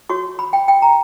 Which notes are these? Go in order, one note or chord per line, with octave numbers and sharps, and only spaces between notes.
F#4 C#5 C#6
B5
G5
G5
A#5